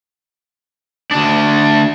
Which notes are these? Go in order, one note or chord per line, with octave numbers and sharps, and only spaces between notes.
D2 D4